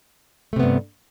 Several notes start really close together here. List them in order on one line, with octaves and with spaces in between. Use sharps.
A3 C3 B3 G2